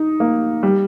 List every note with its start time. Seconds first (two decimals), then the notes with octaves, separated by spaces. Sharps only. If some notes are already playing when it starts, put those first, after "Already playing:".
Already playing: D#4
0.20 A#3
0.63 G3